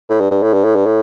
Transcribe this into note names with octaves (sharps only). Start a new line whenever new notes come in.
A2
G2
G2
A2
G2
A2
G2
A2